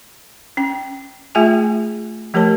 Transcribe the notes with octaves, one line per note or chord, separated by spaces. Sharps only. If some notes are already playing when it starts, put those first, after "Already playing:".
C#4 G5
A3 F4 G#4 E5 G5 G#5
F3 A3 G4 A#4 C#5 A5